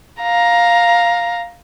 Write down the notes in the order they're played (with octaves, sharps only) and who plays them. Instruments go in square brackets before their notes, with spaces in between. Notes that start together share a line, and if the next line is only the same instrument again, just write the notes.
[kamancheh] F5 A#5